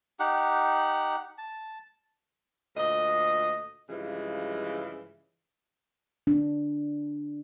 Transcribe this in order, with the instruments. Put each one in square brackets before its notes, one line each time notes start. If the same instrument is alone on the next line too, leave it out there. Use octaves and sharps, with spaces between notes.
[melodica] D#4 G4 F#5
A5
[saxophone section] D2 A#2 D#5
G2 C#3 E3 F3 G#3
[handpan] D4